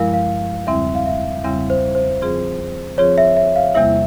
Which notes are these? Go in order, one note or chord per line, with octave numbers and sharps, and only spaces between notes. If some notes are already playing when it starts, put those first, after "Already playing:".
Already playing: G2 F3 G#3 E4 A#4 F5
F5
E2 C#3 G3 C4 E4 E5
F5
E5
E2 C#3 G3 C4 E4
C5
C5
F3 C4 F4 G#4
F3 C4 F4 G#4 C#5
E5
E5
F5
E2 C3 G3 A#3 E4 E5